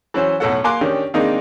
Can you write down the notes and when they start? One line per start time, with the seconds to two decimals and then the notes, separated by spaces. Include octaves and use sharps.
0.14 E3 F#3 C#4 C5
0.40 B1 A2 F#3 F#4 A4 F#5
0.64 A#3 A#4 G#5 C6 D6 F#6
0.81 D#3 C#4 D4 G4
1.14 D#3 G#3 A#3 C4 D4 D#4